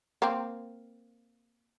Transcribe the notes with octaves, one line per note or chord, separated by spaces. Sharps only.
A#3 C4